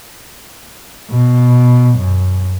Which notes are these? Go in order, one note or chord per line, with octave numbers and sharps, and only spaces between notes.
B2
F#2